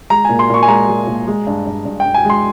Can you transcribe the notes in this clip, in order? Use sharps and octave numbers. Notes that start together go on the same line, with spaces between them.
G#3 A#5
A#2 G#5
C6
A#2 C#6
G#5
G#3 A#5
G#3
A#2
G#3
G2
G2
G2
G5
G2
G#5
G#3 C6